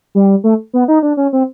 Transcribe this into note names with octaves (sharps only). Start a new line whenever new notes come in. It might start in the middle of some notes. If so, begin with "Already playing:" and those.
G3
A3
B3
D#4
D4
C#4
C4